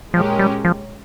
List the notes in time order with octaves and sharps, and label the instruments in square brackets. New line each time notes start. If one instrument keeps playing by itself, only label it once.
[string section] A#2 G#3 C#4 G4 A#4 [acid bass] F3
[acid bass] G3
F3